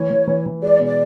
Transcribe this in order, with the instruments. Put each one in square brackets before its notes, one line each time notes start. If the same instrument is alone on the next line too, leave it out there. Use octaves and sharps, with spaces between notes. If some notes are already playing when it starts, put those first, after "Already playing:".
Already playing: [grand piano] E3 [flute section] C#5
[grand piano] E3
E3
E3
[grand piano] G#3 [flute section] D5
[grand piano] B2
[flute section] D5